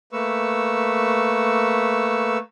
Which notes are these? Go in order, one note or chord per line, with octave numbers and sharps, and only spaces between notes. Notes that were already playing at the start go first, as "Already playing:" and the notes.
A3 A#3 B4 C#6 E6